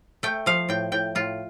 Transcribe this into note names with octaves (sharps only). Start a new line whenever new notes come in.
A3 G5
F3 F5
A2 G5
A2 G5
A2 F4